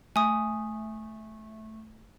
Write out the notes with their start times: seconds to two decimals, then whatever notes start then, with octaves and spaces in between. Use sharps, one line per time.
0.16 A3 G#5 D#6